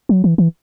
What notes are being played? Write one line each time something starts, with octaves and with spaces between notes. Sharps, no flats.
F#3
E3
E3